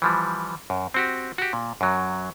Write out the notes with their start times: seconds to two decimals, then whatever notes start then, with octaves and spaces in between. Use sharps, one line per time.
0.02 E3 F3 G3
0.70 F#2
0.94 C4 F#4 G4
1.38 F#4 G4
1.53 A#2
1.81 F#2 F#3